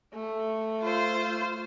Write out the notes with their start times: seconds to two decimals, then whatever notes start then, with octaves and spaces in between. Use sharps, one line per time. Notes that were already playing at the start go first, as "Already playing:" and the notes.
0.15 A3
0.81 F4 C5